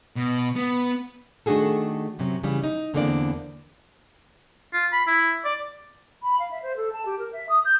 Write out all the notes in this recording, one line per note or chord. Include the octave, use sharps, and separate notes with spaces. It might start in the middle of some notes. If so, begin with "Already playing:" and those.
B2
B3
D#3 A3 D4 F#4 G#4 A4
F#2 C3 F#3
C#3 E3 G3
D#4
E2 D3 E3 A#3 C4 D5
F4
B5
E4
D5
B5
F5
E5
C5
A4
A5
G4
A#4
E5
D#6
G6